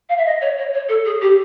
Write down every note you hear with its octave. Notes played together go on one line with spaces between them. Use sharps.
F5
E5
D#5
C#5
C#5
C#5
A4
G#4
G4